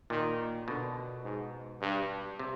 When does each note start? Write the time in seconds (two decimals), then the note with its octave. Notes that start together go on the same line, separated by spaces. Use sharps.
0.10 A#2 D#3
0.68 B2 D3
1.25 G#2
1.81 G2
2.39 C3